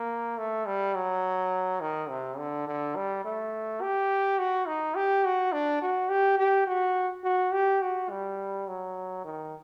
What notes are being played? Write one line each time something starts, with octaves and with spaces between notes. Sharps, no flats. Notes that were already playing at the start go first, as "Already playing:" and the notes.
Already playing: A#3
A3
G3
F#3
D#3
C3
D3
D3
G3
A3
G4
F#4
D#4
G4
F#4
D4
F#4
G4
G4
F#4
F#4
G4
F#4
G3
F#3
D#3